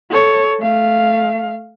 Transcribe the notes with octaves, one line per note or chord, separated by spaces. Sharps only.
A4 C#5
A3 F5